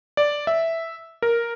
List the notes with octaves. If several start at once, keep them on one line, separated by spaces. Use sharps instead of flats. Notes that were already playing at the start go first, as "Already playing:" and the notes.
D5
E5
A#4